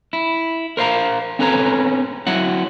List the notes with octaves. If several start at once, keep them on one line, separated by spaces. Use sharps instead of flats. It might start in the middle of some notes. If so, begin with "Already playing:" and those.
E4
A#4 C5 F5 A#5
C4 C#4 A4 B4 C#5 A#5
F#3 E4 F#5